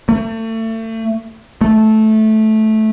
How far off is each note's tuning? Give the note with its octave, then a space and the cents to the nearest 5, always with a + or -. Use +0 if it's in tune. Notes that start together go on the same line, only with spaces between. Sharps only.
A3 +35
A3 -10